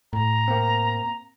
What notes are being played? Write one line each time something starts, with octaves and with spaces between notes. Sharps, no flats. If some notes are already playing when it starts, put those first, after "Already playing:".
A2 A#5
A#3 C4